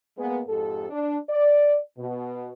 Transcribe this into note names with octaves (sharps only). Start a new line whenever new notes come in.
G#3 A#3 B3
F2 G#2 G4 A4
D4
D5
B2